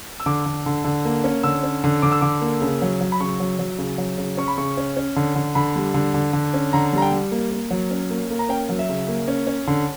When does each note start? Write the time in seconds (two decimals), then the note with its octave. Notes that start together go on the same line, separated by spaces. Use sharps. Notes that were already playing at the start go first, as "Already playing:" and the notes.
0.20 E6
0.26 D3 D6
0.46 D3
0.66 D3
0.85 D3
1.05 A#3
1.24 C#4
1.43 D3 E6
1.64 C#4
1.84 D3
2.02 D3 D6
2.12 E6
2.21 D3 D6
2.42 A#3
2.62 C#3
2.82 F#3
3.01 F#3
3.12 B5
3.20 C#3 C#6
3.40 F#3
3.59 F#3
3.78 C#3
3.98 F#3
4.18 C#3
4.37 C#4 C#6
4.48 B5
4.58 C#3 C#6
4.77 C#4
4.97 C#4
5.16 D3
5.36 D3
5.55 D3 B5
5.76 G3
5.94 D3
6.14 D3
6.33 D3
6.54 C#4
6.73 D3 A#5
6.93 G3 A#5
7.02 G5
7.12 G3
7.32 A#3
7.51 A#3
7.70 F#3
7.91 C#4
8.10 A#3
8.30 A#3
8.39 A#5
8.49 C#4 G5
8.69 F#3
8.79 E5
8.89 C#3
9.08 A#3
9.28 C#4
9.47 C#4
9.67 D3